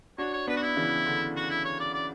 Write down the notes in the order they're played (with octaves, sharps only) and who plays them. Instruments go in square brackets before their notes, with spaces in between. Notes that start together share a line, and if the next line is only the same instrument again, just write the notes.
[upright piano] D4 F#4 [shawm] C#5
[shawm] C#5
[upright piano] B3 D4 [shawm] B4
[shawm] F#4
E4
[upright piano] C#3 E3
D3
[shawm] F#4
E4
C#5
D5
D5